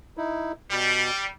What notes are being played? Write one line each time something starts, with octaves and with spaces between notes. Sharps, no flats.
D#4 E4
B2 G3